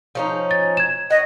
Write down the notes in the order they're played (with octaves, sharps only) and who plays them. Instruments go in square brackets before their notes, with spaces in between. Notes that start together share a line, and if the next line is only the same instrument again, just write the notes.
[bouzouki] F3 C#4 D#4
[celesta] A6
G#6 E7
[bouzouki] C#5 F#5 [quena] D#5